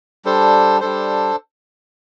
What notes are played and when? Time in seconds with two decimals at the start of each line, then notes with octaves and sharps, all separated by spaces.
0.25 G3 D4 A4 C5
0.80 G3 D4 A4 C5